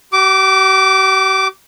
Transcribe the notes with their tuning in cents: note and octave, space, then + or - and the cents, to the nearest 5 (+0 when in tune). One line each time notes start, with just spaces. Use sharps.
G4 -45 D6 -10